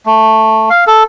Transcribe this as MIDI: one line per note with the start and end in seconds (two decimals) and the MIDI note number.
0.06 0.69 57
0.70 0.84 77
0.87 1.03 69